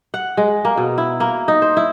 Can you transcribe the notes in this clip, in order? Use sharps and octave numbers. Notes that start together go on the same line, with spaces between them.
F#5
G#3
A#3
B2
E4
A#3
D#4
C5
E4